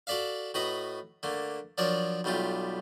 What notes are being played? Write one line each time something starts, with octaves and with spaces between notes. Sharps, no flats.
F#4 A4 D5 E5 F5
A2 F#4 B4 D#5 A#5
D3 A3 A#3
F3 F#3 D4 A#4 C#5 D5
B1 G3 A3 F4 G4